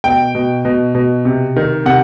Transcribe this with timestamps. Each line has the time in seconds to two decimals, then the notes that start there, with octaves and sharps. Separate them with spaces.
0.04 B2 G5
0.35 B2
0.65 B2
0.95 B2
1.25 C3
1.56 D#3
1.86 C3 F#5